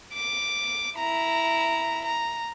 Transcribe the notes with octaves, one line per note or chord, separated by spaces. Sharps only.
D6
E4 A#5
A#5